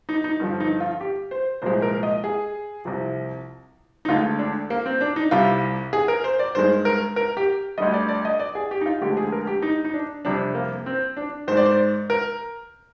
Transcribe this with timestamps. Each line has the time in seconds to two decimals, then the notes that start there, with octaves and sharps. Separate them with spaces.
0.09 D#4
0.24 D#4
0.40 G2 D3 F3
0.60 D#4
0.80 F4
1.00 G4
1.31 C5
1.62 C2 A#2 F3 G#3 C5
1.82 A#4
2.03 D#5
2.24 G#4
2.85 C2 C3 F3
4.05 D#4
4.08 D2 D3 G#3 F4
4.39 D4
4.70 A#3
4.86 C4
5.01 D4
5.16 D#4
5.31 C2 C3 G3 F4
5.93 G#4
6.08 A#4
6.24 C5
6.39 D5
6.55 G2 D#3 G#3 C5
6.85 A#4
7.16 A#4
7.37 G4
7.78 D2 D3 G3 D#5
7.94 D5
8.09 D5
8.25 D#5
8.40 D5
8.55 G#4
8.71 G4
8.81 D#4
8.86 F4
9.01 D2 D3 F3 G#3 G4
9.17 G#4
9.32 A#4
9.47 G4
9.62 D#4
9.85 D#4
9.94 D4
10.25 F2 C3 G3 D4
10.55 A#3
10.86 C4
11.17 D4
11.48 G#2 D#3 G#3 C5
11.57 D5
11.65 C5
12.10 A#4